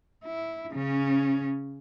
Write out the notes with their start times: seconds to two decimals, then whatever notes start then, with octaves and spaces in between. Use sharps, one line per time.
0.24 E4
0.73 C#3 C#4